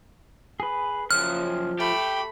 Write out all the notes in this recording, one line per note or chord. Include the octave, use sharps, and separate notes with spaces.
G#4 B4
F#2 C#3 F3 F6 F#6
A3 G4 B5